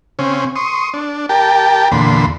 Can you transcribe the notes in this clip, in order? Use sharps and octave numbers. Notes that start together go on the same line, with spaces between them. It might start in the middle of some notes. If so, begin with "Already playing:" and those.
C#3 C4 C#4
C6 C#6 D#6
D4
G4 A#4 G5 A5
E2 A#2 D3 B5 C6